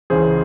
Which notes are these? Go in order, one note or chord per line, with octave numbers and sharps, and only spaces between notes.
C#2 C#3 E3 G#4 C5